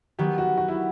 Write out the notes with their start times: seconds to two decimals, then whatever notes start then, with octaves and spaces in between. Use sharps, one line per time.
0.19 D#3 F#3 B3 G4
0.38 F#4
0.58 F#4
0.68 E4